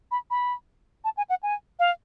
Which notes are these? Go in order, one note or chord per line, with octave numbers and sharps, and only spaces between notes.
B5
B5
A5
G#5
F#5
G#5
F5